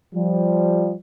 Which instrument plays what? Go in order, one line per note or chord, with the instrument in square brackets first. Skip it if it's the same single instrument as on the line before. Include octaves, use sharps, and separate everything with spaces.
[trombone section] F3 G3